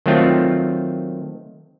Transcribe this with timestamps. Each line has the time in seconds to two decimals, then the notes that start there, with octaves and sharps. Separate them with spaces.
0.06 D#3 F#3 A3 C4 F4